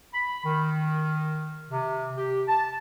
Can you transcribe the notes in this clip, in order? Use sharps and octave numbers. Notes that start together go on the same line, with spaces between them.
B5
D#3
C3
G4
A5